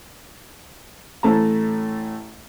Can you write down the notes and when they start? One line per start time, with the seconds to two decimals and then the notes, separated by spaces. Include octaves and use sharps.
1.23 A1 A2 A3 A5 A#5